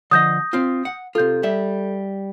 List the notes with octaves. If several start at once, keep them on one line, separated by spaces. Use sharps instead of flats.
D3 F3 D#5 D#6 G6 A#6
C4 F4
F#5
C3 F4 A4 G6
G3 E5